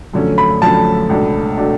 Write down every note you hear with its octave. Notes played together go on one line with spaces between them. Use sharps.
F#2 D3 F3 A3 C#4
B5
F#2 D3 F3 A3 C#4 A5
C#2 B2 A3 D4
B2 A3 D4